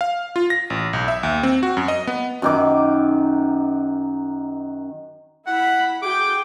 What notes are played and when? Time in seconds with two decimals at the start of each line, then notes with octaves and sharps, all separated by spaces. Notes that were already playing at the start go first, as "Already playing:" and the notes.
0.01 F5
0.36 F4
0.50 A#6
0.70 A1
0.93 B1
1.08 E5
1.23 D#2
1.43 C4
1.63 F#4
1.77 F#2
1.88 D#5
2.07 B3
2.42 F#2 D#3 D6
5.46 E4 F#5 B5
6.02 F#4 G#4 G5 D6